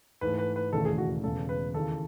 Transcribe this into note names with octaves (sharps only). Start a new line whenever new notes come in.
G#2 E3 A3 B4
B4
B4
E1 D#2 C#3 E3 A3 A4
G#4
F#4
E1 E2 C#3 G#3 A4
B4
D#2 C#3 E3 A4